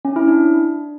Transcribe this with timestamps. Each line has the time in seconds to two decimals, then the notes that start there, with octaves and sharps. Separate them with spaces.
0.05 C#4
0.16 E4
0.27 D4